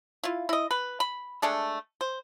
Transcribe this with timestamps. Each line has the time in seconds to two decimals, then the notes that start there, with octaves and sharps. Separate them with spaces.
0.23 E4 F4
0.49 E4 D#5
0.71 B4
1.00 B5
1.42 G#3 A3 D4 A4
2.01 C5